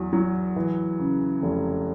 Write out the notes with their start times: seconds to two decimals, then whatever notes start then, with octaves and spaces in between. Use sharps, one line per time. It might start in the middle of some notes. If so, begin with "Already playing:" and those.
Already playing: E2 F#3
0.13 F#3
0.56 E3
0.99 C#3
1.42 F1